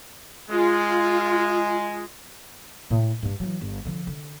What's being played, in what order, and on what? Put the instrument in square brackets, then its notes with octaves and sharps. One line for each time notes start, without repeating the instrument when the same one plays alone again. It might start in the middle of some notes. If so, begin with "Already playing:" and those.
[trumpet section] G#3 [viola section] F4
[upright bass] A2
G2 D4
E3 F#3
G1
D3 F3
D3